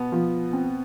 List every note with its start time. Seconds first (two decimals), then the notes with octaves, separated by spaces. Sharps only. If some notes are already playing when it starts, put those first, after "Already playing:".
Already playing: B2 B3
0.12 F3
0.53 C4